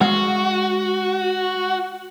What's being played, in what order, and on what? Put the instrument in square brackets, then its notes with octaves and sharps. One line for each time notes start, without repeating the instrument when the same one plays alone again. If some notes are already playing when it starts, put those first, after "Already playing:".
[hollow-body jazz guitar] G#3 F5 F#5 [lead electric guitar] F#4